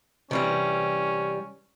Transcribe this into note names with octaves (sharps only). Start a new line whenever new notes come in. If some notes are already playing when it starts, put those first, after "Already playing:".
C3 E3 G3 C#4